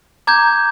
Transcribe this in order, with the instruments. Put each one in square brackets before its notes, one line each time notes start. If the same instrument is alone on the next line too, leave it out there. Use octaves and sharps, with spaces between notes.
[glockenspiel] A#5 D6 G6 G#6